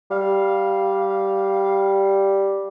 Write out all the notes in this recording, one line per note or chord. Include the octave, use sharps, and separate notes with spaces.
G3 F5